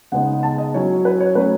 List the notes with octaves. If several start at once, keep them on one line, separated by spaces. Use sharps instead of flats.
C#3 G#3 B3 D#4 F#5
A5
D#5
F#3 C#4 E4 C#5
B4
C#5
F#3 A3 C#4 B4